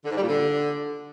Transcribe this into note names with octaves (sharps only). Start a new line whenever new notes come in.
D3
G#2
G3
A#2
D3